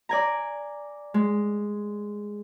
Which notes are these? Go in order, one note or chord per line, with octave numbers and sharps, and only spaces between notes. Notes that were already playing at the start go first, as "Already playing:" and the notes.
D5 G#5 A#5
G#3